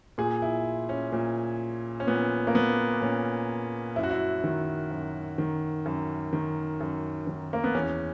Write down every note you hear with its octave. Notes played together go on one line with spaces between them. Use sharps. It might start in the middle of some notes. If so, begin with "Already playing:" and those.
A#2 G#4
E4
C#4
A#2
C#4
A#2 B3
A#3
B3
A#2 C#4
F#2 E4
F#4
E4
D#3
F#2
D#3
F#2
D#3
F#2
D#3
A#3
B3
E2 C#4